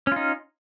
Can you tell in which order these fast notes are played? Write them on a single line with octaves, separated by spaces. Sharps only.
C#4 F4 D#4